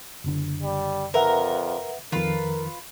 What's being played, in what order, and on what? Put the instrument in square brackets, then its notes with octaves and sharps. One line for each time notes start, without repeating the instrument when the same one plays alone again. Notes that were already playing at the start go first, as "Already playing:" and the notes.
[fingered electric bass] F#1 D3
[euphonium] G3
[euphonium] F2 [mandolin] A#4 [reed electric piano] B4 E5 F#5
[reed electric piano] F2 D#3 [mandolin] F4 B4 [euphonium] A#4